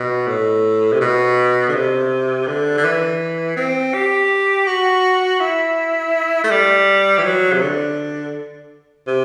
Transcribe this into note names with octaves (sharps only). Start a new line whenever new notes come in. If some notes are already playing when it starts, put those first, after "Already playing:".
Already playing: B2
A2
C3
B2
D3
C3
D3
D3
E3
C4
G4
F#4
E4
A3
G3
E3
F#3
C3
D3
C3